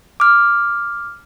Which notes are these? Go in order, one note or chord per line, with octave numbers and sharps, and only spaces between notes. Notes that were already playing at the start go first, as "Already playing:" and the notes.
D6 F6